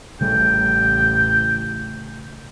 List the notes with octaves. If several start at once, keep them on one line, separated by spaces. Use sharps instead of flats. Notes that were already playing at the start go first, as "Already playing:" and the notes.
A1 C#3 G3 A3 G5